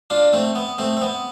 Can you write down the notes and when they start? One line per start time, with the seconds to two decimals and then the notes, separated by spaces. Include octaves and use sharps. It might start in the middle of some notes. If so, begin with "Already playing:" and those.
0.10 D4 F4
0.33 A3 C4
0.55 B3
0.78 A3 C4
0.97 C4
1.01 B3